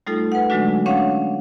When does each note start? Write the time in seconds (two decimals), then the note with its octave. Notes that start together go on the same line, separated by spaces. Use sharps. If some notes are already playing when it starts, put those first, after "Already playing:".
0.07 G3 A3 D#4 F4 A4
0.32 B4 F#5
0.50 D3 F#3 G#3 A3 D4 F#4
0.86 C#4 D4 C#5 F5 F#5